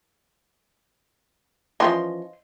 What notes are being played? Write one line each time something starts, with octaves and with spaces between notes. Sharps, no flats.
E3 F3 C#4 D#5 C6